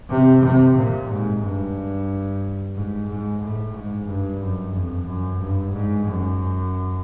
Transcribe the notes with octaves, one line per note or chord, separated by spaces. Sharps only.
C3
C3
A#2
G#2
G2
G#2
G#2
A2
G#2
G2
F#2
F2
F#2
G2
G#2
F#2